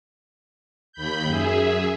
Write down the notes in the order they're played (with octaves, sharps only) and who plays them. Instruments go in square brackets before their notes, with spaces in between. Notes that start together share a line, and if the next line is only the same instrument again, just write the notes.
[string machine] D#2 B5 G6
F#2 G#4 E5